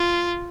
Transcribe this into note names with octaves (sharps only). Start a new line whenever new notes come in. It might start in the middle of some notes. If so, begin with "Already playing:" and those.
Already playing: F4